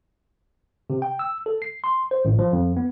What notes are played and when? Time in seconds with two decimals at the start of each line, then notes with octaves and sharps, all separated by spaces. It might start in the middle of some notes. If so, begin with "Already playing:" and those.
0.90 C3
1.02 G5
1.19 E6
1.46 A4
1.62 C7
1.84 C6
2.11 C5
2.25 A1
2.39 F3
2.53 F2
2.77 B3